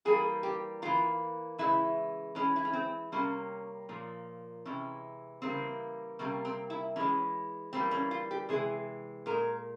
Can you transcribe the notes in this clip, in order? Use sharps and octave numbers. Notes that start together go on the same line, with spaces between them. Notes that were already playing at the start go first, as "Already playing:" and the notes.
E3 G3 A#3 G#4
G4
E3 A#3 F4
C#3 E3 G#3 E4
E3 G#3 C#4
E4
C#4
C4
C3 G3 A#3 C#4
A#2 F3 A#3
C3 E3 G#3 C#4
C#3 E3 G3 A#3 C4
C3 G3 A#3 C#4
C4
E4
E3 G#3 C#4
E3 G3 A#3 C4
C#4
F4
G4
C3 E3 G#3 G#4
A#2 G#3 A#4